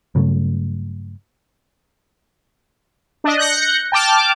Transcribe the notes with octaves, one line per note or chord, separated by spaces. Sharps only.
G2 C#3 F#3 A3
D4 D#5
F#6 G6 A#6 C#7
G5 A5 D6 F6